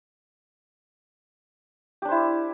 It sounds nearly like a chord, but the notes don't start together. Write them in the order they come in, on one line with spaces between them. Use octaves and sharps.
G4 D4 C5 E4